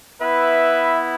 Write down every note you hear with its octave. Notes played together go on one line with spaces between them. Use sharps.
B3 E4 B4 E5